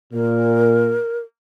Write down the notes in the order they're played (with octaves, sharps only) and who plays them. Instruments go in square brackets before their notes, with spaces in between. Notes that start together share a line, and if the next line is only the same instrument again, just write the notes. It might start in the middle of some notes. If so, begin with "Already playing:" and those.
[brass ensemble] A#2 [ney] A#4